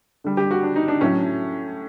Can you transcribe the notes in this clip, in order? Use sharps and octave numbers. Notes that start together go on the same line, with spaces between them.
D3 G3
G4
F#4
D4
D#4
D4
A2 F#3 A3 C#4